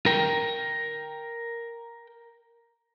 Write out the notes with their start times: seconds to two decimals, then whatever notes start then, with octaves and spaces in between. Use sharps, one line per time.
0.06 A#4 G5